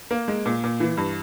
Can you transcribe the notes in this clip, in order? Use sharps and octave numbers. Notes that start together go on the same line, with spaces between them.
A#3
G#3
A#2
A#2
E3
G2